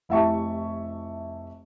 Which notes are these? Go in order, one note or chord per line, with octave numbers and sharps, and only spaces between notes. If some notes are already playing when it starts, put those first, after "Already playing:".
F1 E4 G4 E5 A5 C#6